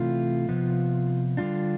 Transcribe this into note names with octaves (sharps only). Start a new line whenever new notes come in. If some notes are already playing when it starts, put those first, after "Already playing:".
Already playing: C3 E3 A3 F4
C3 F3 B3
D3 G3 D4 F4